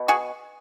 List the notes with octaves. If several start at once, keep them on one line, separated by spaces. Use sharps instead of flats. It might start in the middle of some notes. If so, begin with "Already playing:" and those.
Already playing: B2
F#4 G#4